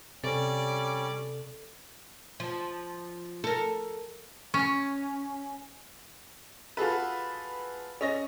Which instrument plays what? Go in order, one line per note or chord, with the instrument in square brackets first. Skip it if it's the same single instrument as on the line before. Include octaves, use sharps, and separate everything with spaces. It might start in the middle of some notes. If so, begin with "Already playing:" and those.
[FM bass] C3 [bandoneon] G3 C#4 [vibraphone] A4 [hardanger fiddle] D5
[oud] F3
A4 A#4
[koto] C#4
[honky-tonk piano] F4 F#4 G#4 A4 B4
C#4 D#5 A#6